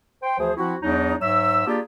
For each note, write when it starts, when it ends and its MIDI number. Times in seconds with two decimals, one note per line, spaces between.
0.23 0.35 72
0.23 0.35 79
0.38 0.51 38
0.38 0.51 52
0.38 0.51 53
0.38 0.51 68
0.38 0.51 72
0.57 0.75 53
0.57 0.75 60
0.57 0.75 64
0.57 0.75 66
0.82 1.14 40
0.82 1.14 54
0.82 1.14 62
0.82 1.14 63
1.21 1.65 44
1.21 1.65 54
1.21 1.65 76
1.21 1.65 88
1.67 1.79 58
1.67 1.79 62
1.67 1.79 65
1.67 1.79 67
1.67 1.79 68
1.67 1.79 74